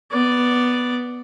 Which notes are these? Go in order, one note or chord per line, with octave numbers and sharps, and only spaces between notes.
B3 D5